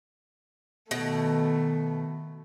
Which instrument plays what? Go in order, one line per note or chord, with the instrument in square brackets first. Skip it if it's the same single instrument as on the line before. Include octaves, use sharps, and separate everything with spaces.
[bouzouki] B2 [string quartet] D#3 A3